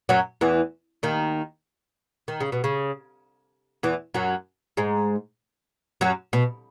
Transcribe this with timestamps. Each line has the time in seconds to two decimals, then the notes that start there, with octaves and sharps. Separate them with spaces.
0.09 F#2 F#3
0.41 E2 E3
1.03 D#2 D#3
2.28 D#3
2.40 C#3
2.52 B2
2.64 C#3
3.83 E2 E3
4.14 F#2 F#3
4.77 G#2 G#3
6.01 F#2 F#3
6.33 B2